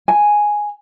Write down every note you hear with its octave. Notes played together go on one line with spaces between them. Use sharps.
G#5